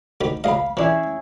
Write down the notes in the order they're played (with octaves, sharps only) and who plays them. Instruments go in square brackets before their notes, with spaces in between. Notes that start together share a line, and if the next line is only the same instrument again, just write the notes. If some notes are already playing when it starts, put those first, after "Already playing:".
[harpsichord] D2 D#3 B5
[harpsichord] C#2 D#5 [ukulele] F5 B5
[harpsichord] E3 D4 [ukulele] C#4 E4 G#4